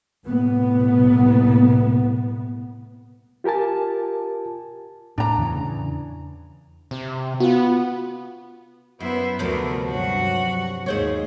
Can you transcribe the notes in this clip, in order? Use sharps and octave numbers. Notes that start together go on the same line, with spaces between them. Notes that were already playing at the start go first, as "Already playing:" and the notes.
C2 A2 C3 B3
F4 G4 A#4 G#5 A5
A2 D4 A#5
E2 C#3 E3
C3
B3 F4 F#4
F#2 B3 E4 C5
D2 C3 F3 A#4 B4
G2 F#3 F#4 F#5
D#2 G#2 G#4 C5 C#5